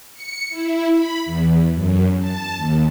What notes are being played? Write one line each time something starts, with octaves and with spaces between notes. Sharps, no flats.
C#7
E4
B5
E2
F#2
A5
D#2